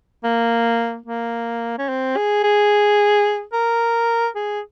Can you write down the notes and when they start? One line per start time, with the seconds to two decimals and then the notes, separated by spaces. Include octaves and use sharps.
0.24 A#3
1.06 A#3
1.79 C#4
1.89 C4
2.17 G#4
2.44 G#4
3.53 A#4
4.36 G#4